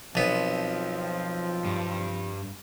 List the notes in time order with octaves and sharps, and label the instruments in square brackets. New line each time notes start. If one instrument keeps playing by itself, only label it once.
[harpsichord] B1 B3 [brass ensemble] F3 C4
[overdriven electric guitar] G2